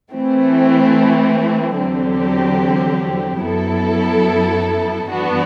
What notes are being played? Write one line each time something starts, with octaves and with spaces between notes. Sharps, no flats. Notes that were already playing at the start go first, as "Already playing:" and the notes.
E3 A3 C4
E2 D3 F#3 C4 G4
F#2 F#3 B3 E4 A4
G2 E3 B3 D4 F#4